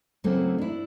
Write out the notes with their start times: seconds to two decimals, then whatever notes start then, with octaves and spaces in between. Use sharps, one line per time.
0.24 C#3 E3 F#3 A3 A#3 C4
0.58 D4 E4